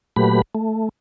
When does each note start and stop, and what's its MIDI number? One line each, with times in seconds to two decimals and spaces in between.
0.16 0.42 46
0.16 0.42 54
0.16 0.42 57
0.16 0.42 67
0.16 0.42 71
0.16 0.42 83
0.55 0.89 57